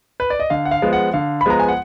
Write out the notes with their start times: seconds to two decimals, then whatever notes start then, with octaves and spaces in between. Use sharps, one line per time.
0.20 B4
0.30 D5
0.40 D#5
0.50 D3 F5
0.65 F#5
0.71 F5
0.82 F3 G#3 B3
0.93 F#5
1.13 D3 F5
1.41 B5
1.46 F3 G#3 B3 A#5
1.60 G#5
1.69 F#5